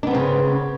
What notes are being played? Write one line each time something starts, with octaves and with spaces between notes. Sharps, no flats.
C#3 B3 C4 D4